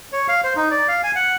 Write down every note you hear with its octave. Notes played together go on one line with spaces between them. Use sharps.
C#5
F5
C5
D#4
D5
F5
G#5
F#5